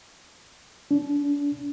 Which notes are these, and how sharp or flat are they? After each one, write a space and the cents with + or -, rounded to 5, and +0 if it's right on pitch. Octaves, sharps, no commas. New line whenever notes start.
D4 -35